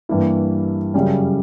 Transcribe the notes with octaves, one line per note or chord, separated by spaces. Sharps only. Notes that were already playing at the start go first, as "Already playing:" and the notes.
G2 E3 A#3 E4
F#2 C#3 G3 C#4